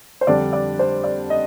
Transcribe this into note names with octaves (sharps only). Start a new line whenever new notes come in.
C5
F2 D3 G3 D4 D5
D5
C5
D5
D#5